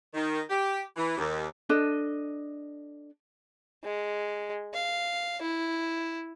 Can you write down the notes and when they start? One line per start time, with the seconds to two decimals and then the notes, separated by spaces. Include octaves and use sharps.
0.14 D#3
0.50 G4
0.96 E3
1.18 D#2
1.69 D4 A4 D#5
3.84 G#3
4.74 F5
5.42 E4